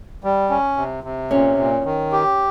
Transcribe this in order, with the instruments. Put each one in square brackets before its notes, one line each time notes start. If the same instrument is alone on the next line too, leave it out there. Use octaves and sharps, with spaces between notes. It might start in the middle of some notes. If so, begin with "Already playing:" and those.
[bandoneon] G3
C#4
C3
C3
[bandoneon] A#2 [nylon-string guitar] C#4
[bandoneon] A#2
D#3
G4